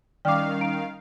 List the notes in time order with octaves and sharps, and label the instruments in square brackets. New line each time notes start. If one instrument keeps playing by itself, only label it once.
[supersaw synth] D#3 F5 [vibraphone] G3 C#4 [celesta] D5 F6 [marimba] G5 D6
[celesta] A#5 D7